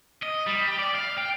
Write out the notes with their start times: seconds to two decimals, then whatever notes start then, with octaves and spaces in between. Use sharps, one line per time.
0.23 D#5
0.47 G3
0.68 G4
0.79 D5
0.95 F5
1.18 G5